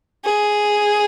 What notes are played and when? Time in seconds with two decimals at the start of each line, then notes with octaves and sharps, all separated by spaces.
0.25 G#4